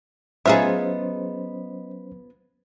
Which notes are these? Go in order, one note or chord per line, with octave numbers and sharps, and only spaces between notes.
F#3 B3 C#4 D#4 F4 G#4 C5 E5